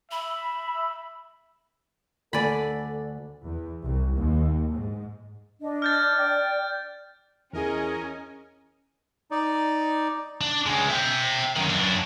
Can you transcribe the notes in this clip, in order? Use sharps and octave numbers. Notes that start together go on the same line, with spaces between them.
E5 B5
D2 A4 D5 G#5 B5
E2
C2
D#2
G#2
D4 D#5
F6 G6 A6
D5 G5
E2 C#4 E4 G#4 A#4 D#5 G#5
D#4 D5
D4
C#3 G#3
E5 G5
F#2 D#3
F#2 D4